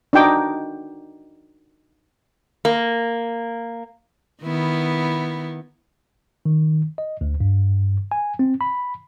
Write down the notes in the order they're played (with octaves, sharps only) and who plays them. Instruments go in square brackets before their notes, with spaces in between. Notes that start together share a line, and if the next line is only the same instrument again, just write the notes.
[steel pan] D4 D#4 F#4 G5 D6
[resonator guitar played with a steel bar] A#3
[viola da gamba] D#3 B3 E4
[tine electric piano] D#3
D#5
D2
G2
G#5
C4
B5